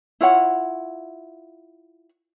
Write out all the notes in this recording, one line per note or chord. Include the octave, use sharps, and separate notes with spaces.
E4 F4 C#5 F#5